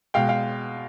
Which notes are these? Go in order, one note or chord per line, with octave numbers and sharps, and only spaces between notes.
B2 G#3 F5 G5
F5 G5